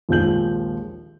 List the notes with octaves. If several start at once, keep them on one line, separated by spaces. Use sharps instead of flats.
A#1 D#2 F3 G#3 G6 F#7